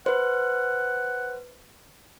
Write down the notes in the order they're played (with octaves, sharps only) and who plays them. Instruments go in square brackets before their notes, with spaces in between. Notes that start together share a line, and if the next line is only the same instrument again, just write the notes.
[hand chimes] B4 C5 [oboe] F#5